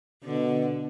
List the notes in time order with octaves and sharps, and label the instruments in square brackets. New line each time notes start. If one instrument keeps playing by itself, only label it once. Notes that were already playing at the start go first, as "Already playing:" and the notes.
[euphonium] B2 [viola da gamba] D3